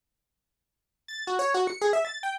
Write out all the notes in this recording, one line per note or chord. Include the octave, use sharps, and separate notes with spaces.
A6
F#4
C#5
F#4
C#7
G#4
E5
A6
G5